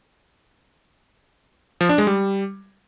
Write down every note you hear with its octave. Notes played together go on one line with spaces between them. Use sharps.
F3
D4
G#3
G3